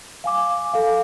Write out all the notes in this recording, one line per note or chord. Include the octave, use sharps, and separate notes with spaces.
F5 G#5 D6
A4 F5